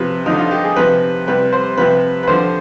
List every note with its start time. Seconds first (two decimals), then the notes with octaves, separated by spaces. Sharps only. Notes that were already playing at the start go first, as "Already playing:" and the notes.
Already playing: C3 F3 B4
0.26 D3 F3 D#4
0.38 F4
0.51 G4
0.64 G#4
0.76 C3 F3 B4
1.27 C3 G3 B4
1.52 C5
1.77 C3 F3 B4
2.23 B4
2.28 D3 F3 C5